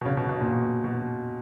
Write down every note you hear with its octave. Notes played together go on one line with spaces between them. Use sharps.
B2
C#3
B2
B2
A#2
B2
B2